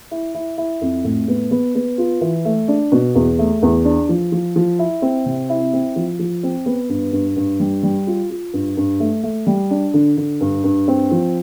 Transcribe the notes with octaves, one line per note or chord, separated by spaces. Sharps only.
E4
E4
E4
F2
A2
B3
B3
B3
F4
E3
A3
D4
B2
E2
A3
E2
D4
F3
F3
F3
E4
C4
C3
E4
C4
F3
F3
C4
B3
G2
G2
G2
G3
G3
F4
F4
G2
G2
A3
A3
G3
D4
D3
D3
G2
G2
C4
F3